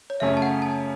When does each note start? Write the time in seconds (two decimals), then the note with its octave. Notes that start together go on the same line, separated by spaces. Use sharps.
0.10 C#5
0.20 F#2 C#3 A3 C#4 E5
0.37 A5
0.42 F#5
0.62 A5